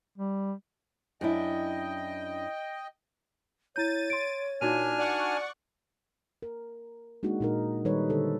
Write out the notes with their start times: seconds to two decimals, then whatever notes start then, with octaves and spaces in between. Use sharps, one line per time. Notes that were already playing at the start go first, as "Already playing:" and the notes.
0.18 G3
1.21 F#2 D4 E4 D#5 G5
3.76 E4 C#5 G6 A6 D#7
4.10 C6 D7
4.61 A#2 D4 D#4 F#4 G#5 F6 D#7
4.99 D5 F#5 C#6
6.42 A#4
7.23 G#3 A#3 D4 D#4 F#4
7.40 A#2 D#4 A#4
7.85 D#3 G3 D#4 A4 B4 C#5
8.09 D3 A4 C5